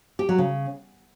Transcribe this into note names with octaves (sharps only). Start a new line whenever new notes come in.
G4
F#3
C#3